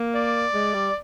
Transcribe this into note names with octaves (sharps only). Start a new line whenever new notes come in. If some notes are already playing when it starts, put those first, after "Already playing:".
Already playing: A#3
D5
G#3
G3